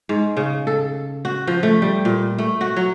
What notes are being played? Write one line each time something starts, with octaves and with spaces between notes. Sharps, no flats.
G#2
C#3
A4
F#4
F3
A3
G3
A#2
A3
F#4
F#3